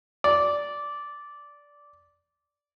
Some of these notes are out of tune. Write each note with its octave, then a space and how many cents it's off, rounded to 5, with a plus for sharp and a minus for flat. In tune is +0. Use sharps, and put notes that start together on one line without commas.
D5 -10